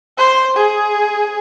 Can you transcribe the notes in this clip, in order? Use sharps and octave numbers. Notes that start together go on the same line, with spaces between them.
C5
G#4